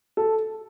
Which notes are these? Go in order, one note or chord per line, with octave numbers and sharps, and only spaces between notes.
A4